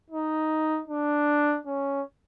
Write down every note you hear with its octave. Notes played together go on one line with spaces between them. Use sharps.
D#4
D4
C#4